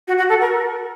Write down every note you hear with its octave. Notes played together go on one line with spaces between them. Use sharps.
F#4
F#4
A4
A#4